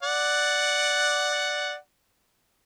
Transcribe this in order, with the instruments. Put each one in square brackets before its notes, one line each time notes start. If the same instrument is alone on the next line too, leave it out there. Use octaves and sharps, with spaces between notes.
[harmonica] D5 F#5